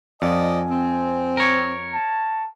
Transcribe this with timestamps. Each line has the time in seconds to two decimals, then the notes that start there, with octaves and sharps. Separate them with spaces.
0.22 F2 F3 D5 D#5 G#5
0.71 C4
1.37 A#4 C#5
1.93 A5